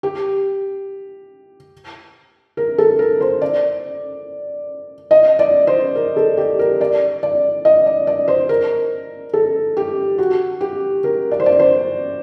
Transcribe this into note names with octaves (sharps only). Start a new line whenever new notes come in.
G4
A#4
A4
A#4
C5
D5
D#5
D5
C5
A#4
A4
G4
A#4
D5
D5
D#5
D5
D5
C5
A#4
A4
G4
F#4
G4
A#4
D5
C5
D5
C5